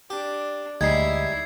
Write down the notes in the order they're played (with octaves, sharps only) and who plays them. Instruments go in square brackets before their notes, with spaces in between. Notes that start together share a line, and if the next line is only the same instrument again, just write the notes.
[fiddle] D4 [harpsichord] G4
[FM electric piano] D2 [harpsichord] G3 G#3 D#4 [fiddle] E4 [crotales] G#6 C7